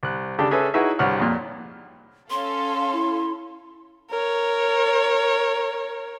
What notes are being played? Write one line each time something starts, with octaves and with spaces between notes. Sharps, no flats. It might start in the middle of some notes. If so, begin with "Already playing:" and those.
C2 F#6
C#3 D4 G4 A4
C#4 G#4 A4 B4 E5 G#5
D#4 E4 F#4 G#4 B4 E5
C2 G2 F#4 C#5 F#5 F6
F2 A#2
C#4 A4 F5 C6
E4
A#4 C#5